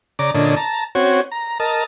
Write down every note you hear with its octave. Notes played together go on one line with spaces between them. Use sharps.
C#3 D5 A#5 D6
A#2 D3 C#4 D4 D#5
A5 A#5
C4 C#4 F#4 C#5
A#5
A#4 D#5 A5